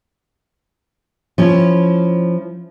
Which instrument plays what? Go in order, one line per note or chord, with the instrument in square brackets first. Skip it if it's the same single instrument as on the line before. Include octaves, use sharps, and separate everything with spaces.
[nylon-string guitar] F3 C#4 E4